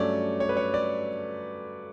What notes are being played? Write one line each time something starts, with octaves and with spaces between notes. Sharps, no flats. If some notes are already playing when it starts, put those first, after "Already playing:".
Already playing: G2 F#3 A3 C#4 C#5 D5
C#5
B4
C#5
D5